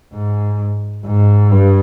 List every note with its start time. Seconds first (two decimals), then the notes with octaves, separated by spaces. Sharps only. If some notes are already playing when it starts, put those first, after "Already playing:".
0.13 G#2
1.06 G#2
1.51 G2